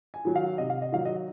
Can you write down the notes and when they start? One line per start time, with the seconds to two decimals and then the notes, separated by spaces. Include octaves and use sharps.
0.14 G#5
0.25 D#3 F#3
0.36 F5
0.58 C3 D#5
0.70 F5
0.82 D#5
0.92 D#3 F#3 F5
1.05 D#5